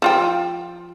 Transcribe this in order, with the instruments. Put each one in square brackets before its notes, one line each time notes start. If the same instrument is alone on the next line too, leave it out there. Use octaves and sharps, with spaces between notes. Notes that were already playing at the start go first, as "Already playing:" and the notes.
[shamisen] F3 F4 G5